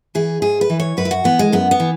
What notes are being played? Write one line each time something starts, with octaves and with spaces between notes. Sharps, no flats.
E3 G#4
G#2 G#4
B4
E3
C#5
F#2 B4
E4
F#4
E3 B3
G#3
F#2 B3
B3
E3